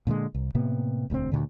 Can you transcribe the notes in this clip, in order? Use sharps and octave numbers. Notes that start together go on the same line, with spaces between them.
A#2 D3 D#3 G#3
C2
A2 C3 A#3 B3
E1 D2 G#3 C4
D2 A#2 D3